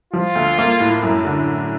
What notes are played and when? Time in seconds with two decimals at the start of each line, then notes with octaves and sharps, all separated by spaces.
0.13 F3 F4
0.35 D2
0.58 A#3
0.80 A2
1.03 F#2
1.25 D3